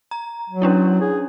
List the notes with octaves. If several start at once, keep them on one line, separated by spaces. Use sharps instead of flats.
A#5
F#3
C#4 D4 E4
G#4